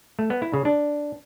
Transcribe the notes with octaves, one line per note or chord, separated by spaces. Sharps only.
A3
B3
E4
C#3
D4